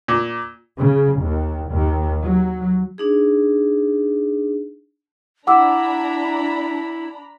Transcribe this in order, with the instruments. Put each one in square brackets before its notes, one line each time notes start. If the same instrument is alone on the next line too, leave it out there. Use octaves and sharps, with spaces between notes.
[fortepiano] A#2
[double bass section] C#3
D#2
D#2
F#3
[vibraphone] D4 D#4 G#4
[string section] D4 A#5 B5 [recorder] E4 [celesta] F#5 D6 E6